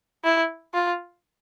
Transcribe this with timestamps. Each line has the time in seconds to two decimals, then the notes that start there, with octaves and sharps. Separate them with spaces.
0.25 E4
0.74 F4